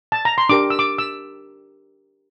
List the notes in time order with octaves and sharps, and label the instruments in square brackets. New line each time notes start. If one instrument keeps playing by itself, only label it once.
[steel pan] A5
A#5
C6
D4 G4 A#4 D6
E6
D6
E6